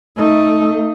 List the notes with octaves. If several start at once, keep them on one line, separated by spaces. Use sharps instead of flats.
A3 D#4